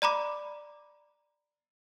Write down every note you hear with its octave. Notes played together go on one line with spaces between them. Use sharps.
D5 A#5 B5 D6